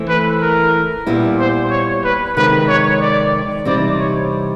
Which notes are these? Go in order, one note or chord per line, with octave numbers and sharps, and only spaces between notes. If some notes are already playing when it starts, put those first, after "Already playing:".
Already playing: E3 A3 C4 E4
B4
A#4
A#2 G3 B3 E4
C5
C#5
B4
F2 C3 D#3 G#3 B4
C#5
D5
C3 E3 G3 C4 D#4 D5
C#5